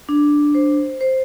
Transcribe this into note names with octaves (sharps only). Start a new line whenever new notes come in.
D4
C5
C5